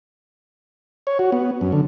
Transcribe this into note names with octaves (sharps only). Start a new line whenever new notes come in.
C#5
F#4
B3
F#2
D3